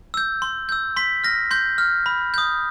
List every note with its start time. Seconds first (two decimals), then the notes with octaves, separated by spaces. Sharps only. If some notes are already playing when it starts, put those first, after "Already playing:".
0.14 E6 G6
0.42 C6
0.69 E6 G6
0.96 C6 B6
1.24 F6 A#6
1.51 C6 G6
1.78 F6
2.06 B5
2.34 D#6 G6